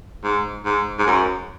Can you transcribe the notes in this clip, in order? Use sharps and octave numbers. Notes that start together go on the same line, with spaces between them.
G#2
G#2
G#2
F#2